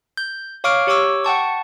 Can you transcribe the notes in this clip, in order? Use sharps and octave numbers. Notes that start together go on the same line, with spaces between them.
G6
C#5 F5 C#6 D6 F6 D7
G4 C#5 C#6 D6 E6
F#5 G5 A5 C#6